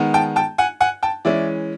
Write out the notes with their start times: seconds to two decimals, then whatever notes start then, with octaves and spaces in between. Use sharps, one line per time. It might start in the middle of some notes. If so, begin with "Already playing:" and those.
Already playing: D#3 G#3 B3
0.14 G5 A5
0.36 G5 A5
0.58 F#5 G#5
0.81 F#5 G#5
1.03 G5 A5
1.25 E3 G#3 C#4 D5 E5